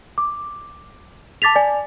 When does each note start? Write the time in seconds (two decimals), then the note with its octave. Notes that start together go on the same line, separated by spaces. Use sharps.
0.18 D6
1.42 A5 D6 A6 B6 F7
1.56 D5 G#5